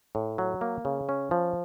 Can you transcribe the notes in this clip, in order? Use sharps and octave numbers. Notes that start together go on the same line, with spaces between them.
A2
F#3
A#3
C#3
C#4
F3